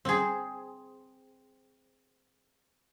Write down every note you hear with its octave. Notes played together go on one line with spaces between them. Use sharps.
C4 G#4